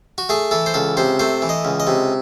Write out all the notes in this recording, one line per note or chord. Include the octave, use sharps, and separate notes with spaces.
F#4
A3 G#4
E3 A4
C5
C#2 A4
C3 C5
A3 C5
E3
D#5
C#2
D#5
C3